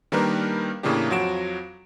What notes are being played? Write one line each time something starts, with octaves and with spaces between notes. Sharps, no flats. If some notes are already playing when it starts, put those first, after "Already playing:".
D#3 G3 A#3 D4 A#4 B4
A2 C#3 E3 A#3 D4 G4
F2 F#3 F4 F#4 D7 E7